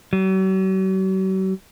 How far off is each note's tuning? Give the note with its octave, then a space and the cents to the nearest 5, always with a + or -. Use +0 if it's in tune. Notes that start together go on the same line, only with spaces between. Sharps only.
F#3 +45